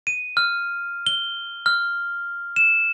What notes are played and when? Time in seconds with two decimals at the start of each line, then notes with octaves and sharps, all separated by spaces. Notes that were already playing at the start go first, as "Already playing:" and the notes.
0.07 D#7
0.37 F6
1.07 G7
1.66 F6
2.56 E7